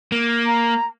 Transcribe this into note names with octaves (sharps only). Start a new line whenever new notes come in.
A#3
A#5